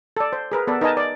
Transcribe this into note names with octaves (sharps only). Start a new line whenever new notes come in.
A4 D5
C5
G#4 A#4 B4
B3 A4 B4 D5
D#4 A#4 B4 D#5 G#5 A5
D5